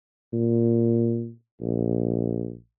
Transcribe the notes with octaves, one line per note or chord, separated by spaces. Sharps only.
A#2
A#1